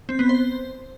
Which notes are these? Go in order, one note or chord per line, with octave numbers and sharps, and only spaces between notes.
C4
B3
C5